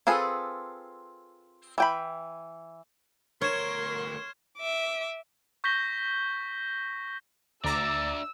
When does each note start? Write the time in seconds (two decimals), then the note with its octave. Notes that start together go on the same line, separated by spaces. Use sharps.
0.07 C4 F4 G#4 A4 B4
1.78 E3 G5 B5
3.42 D2 A#4 C#5 C6 C#6 F6 G#6 E7
4.58 E5 D6
5.64 C#6 G6 A#6 B6 G7
7.64 D2 D4 D5 E5 A#5 D6 E6